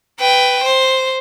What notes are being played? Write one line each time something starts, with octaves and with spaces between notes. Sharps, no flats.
B4 G5
C5